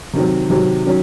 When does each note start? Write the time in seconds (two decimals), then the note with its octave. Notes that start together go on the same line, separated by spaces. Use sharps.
0.14 C3 D#3 F#3 C4
0.50 C3 D#3 F#3 C4
0.86 D#3 F#3 C#4